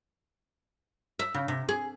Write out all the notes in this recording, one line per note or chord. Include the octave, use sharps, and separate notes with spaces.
E5
C#3
C3
G#4